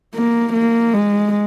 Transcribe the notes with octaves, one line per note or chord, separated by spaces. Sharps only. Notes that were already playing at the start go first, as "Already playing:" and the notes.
A#3
A#3
G#3